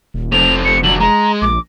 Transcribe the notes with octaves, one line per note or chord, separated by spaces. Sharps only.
D#1
F1 A3 C4 F7
C#7
D3 F#3 F#7
G#3 A#5
A#1 D6